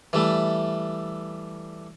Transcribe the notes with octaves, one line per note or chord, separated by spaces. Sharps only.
E3 G3 A3